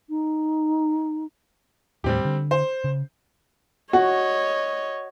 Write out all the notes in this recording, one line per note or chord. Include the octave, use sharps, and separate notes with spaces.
D#4
D#2 A2 G3 C4 G4
D3
C5
C#3
F#4 C#5 D#5